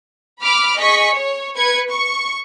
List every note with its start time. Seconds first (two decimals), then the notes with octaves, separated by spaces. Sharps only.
0.41 B5 D6 F6
0.78 G#4 D#5 C#6 B6
1.14 C#5
1.57 B4 G#6 C#7
1.89 C#6